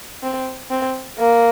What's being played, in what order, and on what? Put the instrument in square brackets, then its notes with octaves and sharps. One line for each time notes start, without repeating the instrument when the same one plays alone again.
[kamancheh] C4
C4
A#3